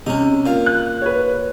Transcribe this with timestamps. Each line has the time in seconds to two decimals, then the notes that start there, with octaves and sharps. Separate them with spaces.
0.06 C3 C#4 D#4
0.46 A#2 F5
0.66 F#6
1.02 B4 C#5